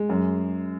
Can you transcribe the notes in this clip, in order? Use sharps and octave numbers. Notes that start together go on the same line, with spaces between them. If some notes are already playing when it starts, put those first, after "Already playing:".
Already playing: G#3
F#2